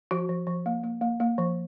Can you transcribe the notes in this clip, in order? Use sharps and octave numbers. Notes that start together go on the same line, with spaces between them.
F3 F#4
F3
F3
A#3
A#3
A#3
A#3
F3